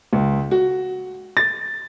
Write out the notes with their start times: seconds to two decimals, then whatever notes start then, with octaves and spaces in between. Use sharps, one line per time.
0.13 C#2
0.51 F#4
1.37 A6